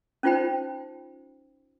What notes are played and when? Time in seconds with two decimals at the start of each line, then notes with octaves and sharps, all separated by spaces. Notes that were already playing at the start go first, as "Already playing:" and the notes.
0.23 C#4 D#4 F4 C5 G5 B5